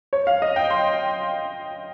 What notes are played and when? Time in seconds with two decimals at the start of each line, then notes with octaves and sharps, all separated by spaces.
0.13 C#5
0.27 F5
0.42 D#5
0.56 G5
0.70 C6